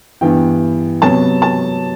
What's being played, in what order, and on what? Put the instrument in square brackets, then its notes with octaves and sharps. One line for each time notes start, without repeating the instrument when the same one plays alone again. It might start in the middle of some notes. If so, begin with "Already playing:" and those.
[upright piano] G2 E3 B3 G5
C3 F#3 B3 A5
A5